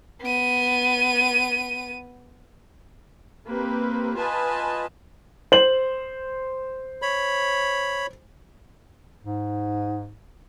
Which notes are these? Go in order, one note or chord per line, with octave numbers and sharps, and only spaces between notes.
B3 D#7
A#3 C4 G4 B4
F4 B4 D#5 G#5 A5
C5 F#7
C#5 B5
G#2